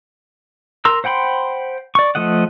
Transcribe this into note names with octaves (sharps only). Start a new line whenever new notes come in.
A#4 A#5 C6 E6
C5 F#5 G5 B5 C6
D5 C#6
F3 A3 D#5 F#5